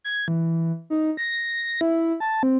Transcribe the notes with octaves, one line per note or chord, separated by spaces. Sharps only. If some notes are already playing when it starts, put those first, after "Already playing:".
G#6
E3
D#4
A#6
E4
A5
C4